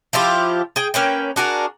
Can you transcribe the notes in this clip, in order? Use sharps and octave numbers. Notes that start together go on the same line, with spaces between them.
F3 E4 F4 G4
G#4 G5
A#3 C#4 B4 G5
D4 F#4 G#4 A#4